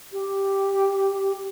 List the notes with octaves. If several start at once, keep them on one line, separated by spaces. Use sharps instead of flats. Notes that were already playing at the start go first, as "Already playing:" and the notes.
G4